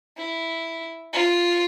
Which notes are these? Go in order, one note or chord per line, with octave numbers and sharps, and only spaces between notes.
E4
F4